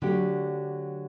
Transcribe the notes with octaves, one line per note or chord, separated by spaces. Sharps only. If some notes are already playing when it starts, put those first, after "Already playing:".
D3 F#3 A3 D4 G4